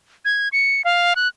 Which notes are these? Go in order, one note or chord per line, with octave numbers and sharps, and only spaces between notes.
G#6
C#7
F5
F#6